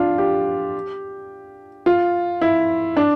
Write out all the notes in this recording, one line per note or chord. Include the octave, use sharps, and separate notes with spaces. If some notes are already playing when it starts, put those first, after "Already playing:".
Already playing: D4 F4
G4
F4
E4
D4